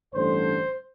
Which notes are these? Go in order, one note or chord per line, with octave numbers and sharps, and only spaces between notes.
A1 G2 D3 G3 C5